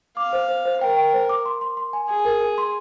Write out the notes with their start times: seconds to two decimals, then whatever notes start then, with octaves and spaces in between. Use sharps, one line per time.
0.17 F5 D6
0.33 C5
0.49 C5
0.65 C5
0.81 A#4 G5
0.97 G5
1.13 C5
1.29 D6
1.46 C6
1.61 C6
1.77 C6
1.93 G#5
2.09 G#4 G#5
2.25 A#4
2.41 G#5
2.58 C6